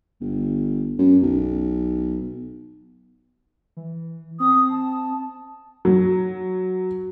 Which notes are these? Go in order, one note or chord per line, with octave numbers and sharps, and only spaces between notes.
G1
F#2
B1
E3
C4 D#6
A5
F#3